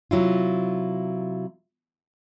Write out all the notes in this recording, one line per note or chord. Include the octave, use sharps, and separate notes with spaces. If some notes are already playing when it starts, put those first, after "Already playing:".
C3 F#3 E4 F4